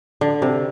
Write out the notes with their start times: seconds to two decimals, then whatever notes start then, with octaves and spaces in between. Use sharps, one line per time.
0.21 D3
0.42 C3